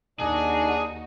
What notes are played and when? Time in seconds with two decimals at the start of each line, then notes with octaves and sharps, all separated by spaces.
0.20 D#2 D4 D#4 F#4 G#4